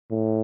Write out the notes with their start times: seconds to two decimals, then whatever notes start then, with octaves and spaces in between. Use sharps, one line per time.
0.11 A2